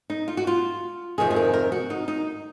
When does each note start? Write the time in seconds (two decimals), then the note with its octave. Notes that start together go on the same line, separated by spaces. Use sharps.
0.10 D#4
0.28 F4
0.37 F#4
0.47 F4
1.18 F2 C3 D#3 G#4
1.31 G#4
1.36 A#4
1.53 A#4
1.72 F#4
1.90 D#4
2.08 D#4